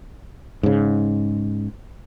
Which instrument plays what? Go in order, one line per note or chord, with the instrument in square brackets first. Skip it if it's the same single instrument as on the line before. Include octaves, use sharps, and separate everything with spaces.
[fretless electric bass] G#2 C#3